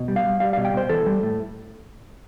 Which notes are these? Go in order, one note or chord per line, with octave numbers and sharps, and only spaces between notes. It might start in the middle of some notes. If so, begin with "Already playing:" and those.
Already playing: B2
G3
F5
G3
G3 F5
B2 F5
G5
B2 C5
E3 A4
G3
A2